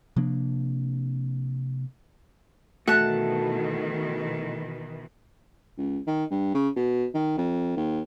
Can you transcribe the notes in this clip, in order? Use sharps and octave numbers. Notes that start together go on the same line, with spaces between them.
C3 F3 A#3 D4
B2 D#3 E3 A3 F#4 A5 F#6
C#2
D#3
G2
C#3
B2
D#3
F2
D#2